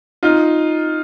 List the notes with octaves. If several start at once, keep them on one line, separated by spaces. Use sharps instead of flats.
D#4 F4